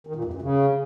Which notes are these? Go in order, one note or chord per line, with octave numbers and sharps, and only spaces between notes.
D#3
A#2
E2
F#2
C#3